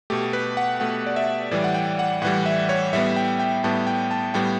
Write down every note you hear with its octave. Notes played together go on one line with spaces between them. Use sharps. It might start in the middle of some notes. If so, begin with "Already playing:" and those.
B2 A3 G4
B4
F#5
B2 A3 F#5
D5
E5
A2 E3 G3 D5
F#5
G5
F#5
A2 E3 G3 F#5
E5
C#5
A2 G3 B3 E5
G5
G5
A2 G3 B3 A5
G5
A5
A2 G3 B3 G5